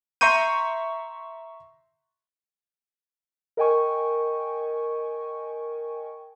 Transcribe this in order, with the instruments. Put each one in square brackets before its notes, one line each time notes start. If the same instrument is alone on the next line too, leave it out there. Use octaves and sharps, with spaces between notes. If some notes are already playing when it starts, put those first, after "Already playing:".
[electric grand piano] E5 A#5 C6 C#6 G6 D#7
[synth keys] A#4 D#5 G5 G#5 C#6